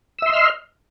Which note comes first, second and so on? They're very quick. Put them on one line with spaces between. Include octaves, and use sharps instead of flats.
E6 E5 C6 D#5 F6